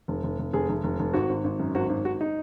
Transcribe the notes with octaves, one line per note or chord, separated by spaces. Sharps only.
F1
F1
F1
F1 G#4
F1
F1
F1
G#1 F#4
G#1
G#1
F#2
G#1 F#4
G#1
G#1 F#4
D#4